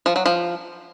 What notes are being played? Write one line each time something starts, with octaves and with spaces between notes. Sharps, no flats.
F3
F#3
F3